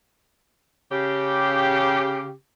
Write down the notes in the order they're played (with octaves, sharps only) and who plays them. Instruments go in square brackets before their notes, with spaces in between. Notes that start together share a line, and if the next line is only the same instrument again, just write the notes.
[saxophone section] C#3 G4